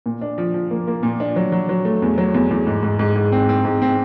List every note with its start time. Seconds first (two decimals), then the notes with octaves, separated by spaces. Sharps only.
0.06 A#2
0.21 D4
0.38 F3
0.54 F3
0.71 A#3
0.87 A#3
1.03 A#2
1.20 D4
1.36 F#3
1.52 F#3
1.69 F#3
1.85 A3
2.02 E2
2.18 F#3
2.34 E2
2.51 E2
2.67 G#2
2.83 G#2
2.99 G#2
3.16 G#2
3.32 C4
3.49 C4
3.65 G#2
3.82 C4